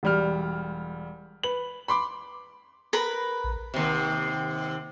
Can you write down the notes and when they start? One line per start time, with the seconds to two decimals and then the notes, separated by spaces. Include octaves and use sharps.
0.03 E1 G3 F6
1.43 B4 F#7
1.88 B5 C6 D6
2.93 A#4 B4 B5
3.44 A#1
3.74 D#2 C3